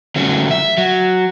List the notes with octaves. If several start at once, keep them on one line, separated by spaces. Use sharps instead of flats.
D3 F#3 G3 A3 C#4
E5
F#3